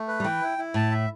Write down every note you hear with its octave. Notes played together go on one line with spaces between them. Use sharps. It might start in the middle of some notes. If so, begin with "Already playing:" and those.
Already playing: A3
B4
G3
E3 G5
E4
E4
A2 A5
E5